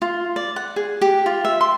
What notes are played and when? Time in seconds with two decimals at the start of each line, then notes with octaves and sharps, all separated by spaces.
0.02 F4
0.36 D5
0.56 F#5
0.76 G#4
1.01 G4
1.26 F4
1.45 E5
1.61 C6